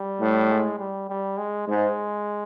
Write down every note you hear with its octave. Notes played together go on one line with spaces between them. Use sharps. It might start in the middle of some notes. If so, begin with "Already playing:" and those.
Already playing: G3
A2
G#3
G3
G3
G#3
G#2 G#3